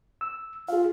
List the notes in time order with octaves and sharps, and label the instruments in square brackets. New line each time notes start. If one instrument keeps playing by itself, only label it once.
[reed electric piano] E6
[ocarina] F4 [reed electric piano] G#4 F5